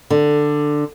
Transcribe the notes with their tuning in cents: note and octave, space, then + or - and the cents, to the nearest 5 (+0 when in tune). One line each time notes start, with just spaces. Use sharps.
D3 +10